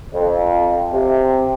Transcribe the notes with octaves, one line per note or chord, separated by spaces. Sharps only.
F2
C3